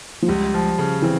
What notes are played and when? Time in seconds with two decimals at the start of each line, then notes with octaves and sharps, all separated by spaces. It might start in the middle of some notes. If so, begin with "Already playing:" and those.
0.22 F3
0.28 C#2 G3
0.54 F3
0.78 C#3
1.02 E3 C4